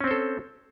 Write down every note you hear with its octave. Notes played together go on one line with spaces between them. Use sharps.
C4 C#4 A4 C5